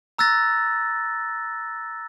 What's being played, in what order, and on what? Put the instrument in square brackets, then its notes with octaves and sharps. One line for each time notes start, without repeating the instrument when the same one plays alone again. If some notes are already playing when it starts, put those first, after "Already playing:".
[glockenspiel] A#5 E6 F#6 A6 A#6